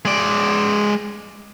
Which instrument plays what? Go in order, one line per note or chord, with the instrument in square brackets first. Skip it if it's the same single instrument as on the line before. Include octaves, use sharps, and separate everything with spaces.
[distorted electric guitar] G#3 D5